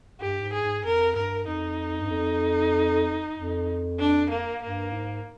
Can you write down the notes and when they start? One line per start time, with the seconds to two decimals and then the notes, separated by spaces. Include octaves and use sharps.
0.21 G2 G4
0.42 G#2
0.53 G#4
0.63 G#2
0.84 F2 A#4
1.15 G2 A#4
1.47 F2 D#4
2.01 G2
2.10 F2
3.35 F2
3.99 D4
4.30 A#3
4.61 G2 A#3
4.93 G#2